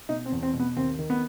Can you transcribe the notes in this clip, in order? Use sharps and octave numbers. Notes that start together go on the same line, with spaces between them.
B2 D#4
C4
E2
C4
B2
B3
D#2 C4
D#3
B3